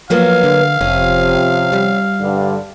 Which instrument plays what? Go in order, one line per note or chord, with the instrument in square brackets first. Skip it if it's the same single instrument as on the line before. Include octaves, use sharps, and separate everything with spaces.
[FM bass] F3 [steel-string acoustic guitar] F#3 A#3 B3 [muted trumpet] F5
[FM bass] D3
[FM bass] F1 [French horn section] C3 F3 [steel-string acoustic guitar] C#4
[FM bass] G3
[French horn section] G2 D3